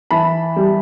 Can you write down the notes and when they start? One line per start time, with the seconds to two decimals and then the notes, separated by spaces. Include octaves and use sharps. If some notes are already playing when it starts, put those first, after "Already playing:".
0.11 E3 A5 B5
0.56 G3